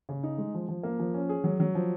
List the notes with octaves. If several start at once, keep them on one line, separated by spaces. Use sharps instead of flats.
C#3
D#4
G#3
F3
F3
A#3
F3
C#4
G#4
F#3
F#3
F3